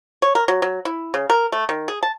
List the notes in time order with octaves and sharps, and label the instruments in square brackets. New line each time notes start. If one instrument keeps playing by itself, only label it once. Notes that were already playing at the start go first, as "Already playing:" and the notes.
[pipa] C#5
A#4
F#3
F#3
E4
C#3
A#4
A3
D#3
G#4
A5